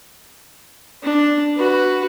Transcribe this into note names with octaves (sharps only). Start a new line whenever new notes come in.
D4
F#4 B4